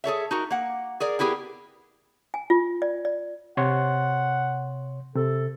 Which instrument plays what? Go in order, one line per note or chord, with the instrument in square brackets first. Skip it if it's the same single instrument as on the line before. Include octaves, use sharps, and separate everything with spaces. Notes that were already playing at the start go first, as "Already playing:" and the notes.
[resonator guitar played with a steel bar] G#4 A4 C#5 E5
D#4 F#4 A#4
A#3 F#5
G#4 A#4 D5
B3 E4 G4 G#4 A#4
[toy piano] G#5
F4
D5
D5
[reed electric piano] C3 C#5 C6 [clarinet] F#5
[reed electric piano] C3 [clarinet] A4